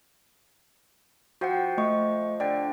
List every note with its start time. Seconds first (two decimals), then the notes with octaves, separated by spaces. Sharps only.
1.41 F3 F#4 F#5 G5
1.78 A3 D#5 C#6
2.40 D3 D5 G5